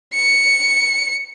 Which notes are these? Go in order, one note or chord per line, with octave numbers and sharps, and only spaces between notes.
C#7